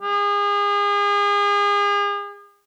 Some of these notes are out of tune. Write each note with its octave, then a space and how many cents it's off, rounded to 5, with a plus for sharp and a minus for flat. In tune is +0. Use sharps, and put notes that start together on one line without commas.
G#4 -35